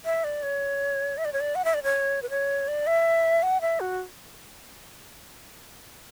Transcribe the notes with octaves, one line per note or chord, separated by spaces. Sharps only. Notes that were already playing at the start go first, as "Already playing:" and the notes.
E5
D5
C#5
E5
D5
C#5
D5
F#5
E5
D5
C#5
B4
C#5
D5
E5
F#5
E5
F#4